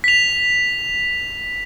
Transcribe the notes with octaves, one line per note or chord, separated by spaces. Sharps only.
B6 F7